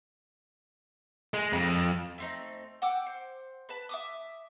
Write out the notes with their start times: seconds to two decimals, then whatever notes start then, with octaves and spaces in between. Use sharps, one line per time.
1.34 G#3
1.53 F2
2.18 A3 C4 D#4
2.82 F#5 G5 D6 E6
3.06 C5
3.69 B4 A5
3.89 E5 D6 D#6